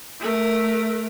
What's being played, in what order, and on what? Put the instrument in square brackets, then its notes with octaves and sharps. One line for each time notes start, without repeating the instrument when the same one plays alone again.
[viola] A3 A#4